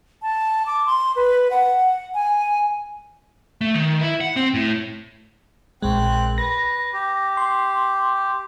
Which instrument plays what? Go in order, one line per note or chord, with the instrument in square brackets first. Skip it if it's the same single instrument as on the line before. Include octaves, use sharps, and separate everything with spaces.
[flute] A5
D6
C6
B4
F#5
G#5
[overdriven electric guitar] A3
D#3
E4
F#5
C4
A2
[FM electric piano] A#1 G#3 [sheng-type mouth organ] C4 F#6
[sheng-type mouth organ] B4 [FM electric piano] A#6
[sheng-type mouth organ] G4
[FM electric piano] C6